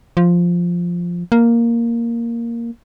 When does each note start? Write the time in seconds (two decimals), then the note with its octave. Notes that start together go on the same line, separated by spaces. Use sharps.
0.17 F3
1.32 A#3